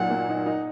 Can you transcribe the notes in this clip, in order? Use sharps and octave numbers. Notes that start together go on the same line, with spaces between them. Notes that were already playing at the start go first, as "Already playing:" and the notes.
Already playing: A#2 F#3 D#4 F#5
A#3
D#4
D#4